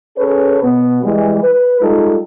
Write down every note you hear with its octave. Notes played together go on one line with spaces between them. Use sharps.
C#4 G#4 A4 B4 C#5
B2 B3
E3 G3 G#3
B4
G3 G#3 D#4 F4 A4